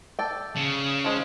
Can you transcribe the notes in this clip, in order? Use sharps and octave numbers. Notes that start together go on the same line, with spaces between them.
A4 D5 G5
C#3
F3 G#3